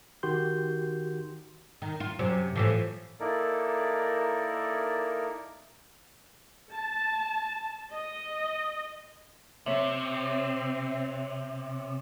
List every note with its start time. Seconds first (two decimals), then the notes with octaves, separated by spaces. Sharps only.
0.23 D#3 F#4 G4 C6 G6
1.82 D#3
2.00 F4
2.19 F#2 C3
2.56 A2 E3 F3
3.20 A#3 D#4 E4 A4 A#4 D5
6.73 A5
7.92 D#5
9.66 C3 C4 C#5 E5